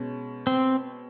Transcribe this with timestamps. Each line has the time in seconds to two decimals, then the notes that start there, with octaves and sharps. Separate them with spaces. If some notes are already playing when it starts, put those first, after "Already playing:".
Already playing: B2 G#3 C#4
0.47 C4